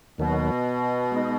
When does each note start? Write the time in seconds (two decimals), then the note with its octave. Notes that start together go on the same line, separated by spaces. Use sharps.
0.18 D#2 B2 D#3 F#3 B3
1.12 G#3 B3 D#4